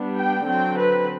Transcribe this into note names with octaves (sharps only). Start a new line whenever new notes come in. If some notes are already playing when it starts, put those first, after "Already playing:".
Already playing: G3 B3 D4
G5
D3 F#3 C4 G5
B4